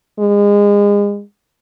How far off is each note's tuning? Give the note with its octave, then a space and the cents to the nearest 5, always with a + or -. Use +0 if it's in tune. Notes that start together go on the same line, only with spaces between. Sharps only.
G#3 -30